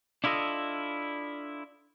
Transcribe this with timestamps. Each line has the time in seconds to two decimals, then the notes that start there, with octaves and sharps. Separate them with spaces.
0.24 D4 E4 F4 A4 D#5